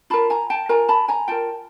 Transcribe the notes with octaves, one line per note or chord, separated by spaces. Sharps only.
F4 A#4 A5 B5
G#5 A#5
G5 A5
F4 A#4 G#5 A#5
A5 B5
G#5 A#5
F4 A#4 G5 A5